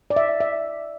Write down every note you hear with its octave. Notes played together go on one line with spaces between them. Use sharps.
D5
E5
E5